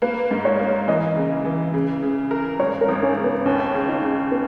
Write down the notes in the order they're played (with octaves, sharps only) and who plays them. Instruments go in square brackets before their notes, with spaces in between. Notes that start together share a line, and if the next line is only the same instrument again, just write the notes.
[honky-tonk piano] A#3 [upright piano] B4
[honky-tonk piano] G#2
[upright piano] C#5
[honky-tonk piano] A#3
[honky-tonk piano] E3 [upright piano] D#5
[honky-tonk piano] C#3
E3
C#3
C#3
A#4
[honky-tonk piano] G#1 [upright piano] C#5
[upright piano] A#4
[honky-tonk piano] G#1
[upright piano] C#4
[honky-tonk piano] C#3
[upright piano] B3
[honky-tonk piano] D#2 [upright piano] C#4
[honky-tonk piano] C#3
[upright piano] D#4
[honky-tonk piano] C#3
[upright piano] B3